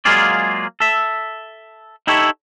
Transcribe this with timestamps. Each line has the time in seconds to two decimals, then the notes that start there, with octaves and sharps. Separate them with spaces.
0.05 F#3 G#3 A#3 F4 G#4 D5
0.80 A4 E5
2.07 D#4 E4 G4 A4 C#5